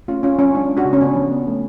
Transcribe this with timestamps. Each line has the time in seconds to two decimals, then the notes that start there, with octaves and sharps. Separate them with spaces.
0.08 A3 C#4 F4
0.23 C#4 F4
0.39 F#3 C#4
0.54 G#3 D4
0.69 C#4
0.77 D4 F#4
0.85 C#3
0.93 C#4
1.01 B3 D4
1.16 F3
1.32 B3
1.47 A3